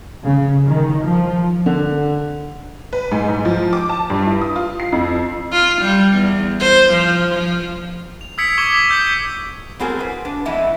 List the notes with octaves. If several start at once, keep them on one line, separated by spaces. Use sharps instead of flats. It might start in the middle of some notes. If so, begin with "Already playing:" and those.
C#3
D#3
F3
D3
B4
G#2
G#2
F3
D6
A5
G2
E4
D#6
F4
C7
F2
F4
G3
E2
C5
F3
F3
F7
D#6 E6 G#6 B6 C#7 D7
C#6 D6 G#6 G7
D6 D#6 G#6
E6 G6 C#7 G7
A2 B3 C4 F#4 G#4 A#4
G#4 B4
D4 B4 F#5
F2 A2 E3 G#3 B3 E4